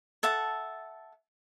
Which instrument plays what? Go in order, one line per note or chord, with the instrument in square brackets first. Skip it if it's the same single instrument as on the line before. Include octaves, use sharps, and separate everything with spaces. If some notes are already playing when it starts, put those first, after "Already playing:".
[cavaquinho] A4 E5 F#5 A5